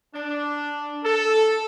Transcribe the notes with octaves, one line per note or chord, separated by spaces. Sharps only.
D4
A4